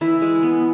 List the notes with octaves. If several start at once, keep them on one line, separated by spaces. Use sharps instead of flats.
E3 E4
G#3
B3